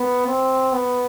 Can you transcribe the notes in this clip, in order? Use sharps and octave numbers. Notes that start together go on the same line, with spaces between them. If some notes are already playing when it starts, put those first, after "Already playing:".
Already playing: B3
C4
B3